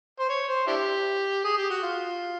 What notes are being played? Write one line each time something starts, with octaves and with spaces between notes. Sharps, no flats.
C5
C#5
C5
D4 E4 G4
G#4
G4
F#4
F4